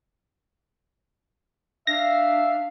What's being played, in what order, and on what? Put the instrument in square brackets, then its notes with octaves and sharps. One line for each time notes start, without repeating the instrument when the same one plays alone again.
[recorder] D4 [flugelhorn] E5 [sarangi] F5 [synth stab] A#6